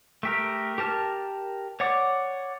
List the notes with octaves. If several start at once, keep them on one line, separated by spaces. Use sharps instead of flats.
A3 G4 A#4
G4 A#4 A5 F6
C#5 D5 F#5 D6